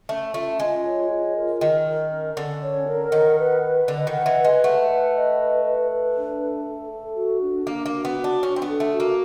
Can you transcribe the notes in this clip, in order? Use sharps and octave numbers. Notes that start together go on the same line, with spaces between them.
A3 C#4
A3 F4
G#3 F4
C#5
F4
A#4
D#3 A#4
A#4
C#4
D3 C#4
C#5
A#4
D#3 F#5
B4
B4
D3 D#5
D#3
F#5
E3
B4
G#3
A3 F#5
B4
D#5
B4
B4
B4
D4
A4
A4
A4
F#4
D4
A#3 D4
A#3
F#4
B3
F#4
D4
C#4 D4
C4
B3
A4
A3
F#4
A#3